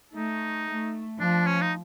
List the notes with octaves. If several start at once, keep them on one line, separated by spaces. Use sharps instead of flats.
A3 D#4
A3
F3 D4
C#4
D#4